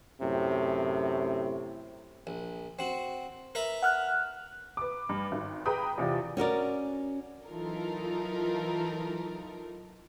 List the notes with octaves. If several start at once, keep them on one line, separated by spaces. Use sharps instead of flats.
F#2 A2 C3
A#1
C4 F#4
A#4 B4 E5
F#5 F6 F#6
B4 D6
G2
G#1
G#4 B4 G5 A#5 B5 D#6
E2 C3 F4 D5
C#4 F#4 A#4 D5
E3 F#3 D#4 F4 A4 A#4